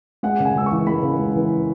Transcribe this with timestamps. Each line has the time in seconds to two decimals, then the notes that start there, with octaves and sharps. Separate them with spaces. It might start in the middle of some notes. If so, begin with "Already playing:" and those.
0.23 G#3 F#5
0.40 C#3
0.45 G#5
0.55 C#2 E6
0.66 C#6
0.71 E3
0.87 G#3 B5
1.03 C#3
1.19 C#2
1.35 E3